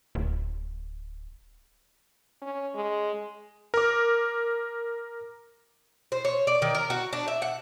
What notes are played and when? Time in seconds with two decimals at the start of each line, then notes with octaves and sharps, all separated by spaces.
0.15 D1
2.42 C#4
2.75 G#3
3.74 A#4 D6
6.12 C5
6.25 C#5
6.47 D5
6.62 D#3
6.75 A#4
6.90 F#4
7.13 D4
7.28 E5
7.42 F#5